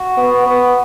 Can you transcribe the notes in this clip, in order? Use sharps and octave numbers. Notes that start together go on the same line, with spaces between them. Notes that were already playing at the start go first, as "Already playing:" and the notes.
Already playing: F#4
B3
B3